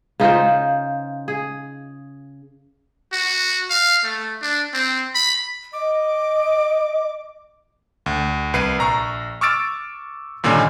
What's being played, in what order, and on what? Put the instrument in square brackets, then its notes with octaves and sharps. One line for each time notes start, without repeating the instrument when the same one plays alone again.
[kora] C#3 D#4 F4 C5
G#4
[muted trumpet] F#4
F5
A3
D4
C4
B5
[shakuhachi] D#5 [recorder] D6
[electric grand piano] D2
C2 B4 C7 D#7
A#1 A#5 C#6
C#6 D6 E6 F6 A6 D7
G2 A#2 D3 D#3 C#4 D#4